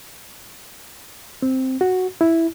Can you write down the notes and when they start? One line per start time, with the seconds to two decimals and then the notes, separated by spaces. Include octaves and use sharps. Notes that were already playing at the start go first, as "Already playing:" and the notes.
1.42 C4
1.81 F#4
2.21 E4